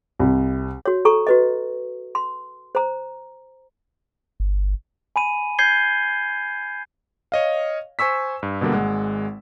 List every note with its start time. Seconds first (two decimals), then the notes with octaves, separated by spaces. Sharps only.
0.20 C2
0.86 F#4 C#5
1.05 A4 A#5 C#6
1.27 F#4 B4 D#5
2.15 C6
2.75 C5 A#5
4.40 G1
5.16 G#5 B5 D#7
5.59 G6 G#6 C7 G7
7.32 C#5 D#5 F5
7.99 C5 G#5 C#6 E6 B6
8.43 G2
8.61 B2 D3 G3 A#3
8.73 G#1 G#3 F#5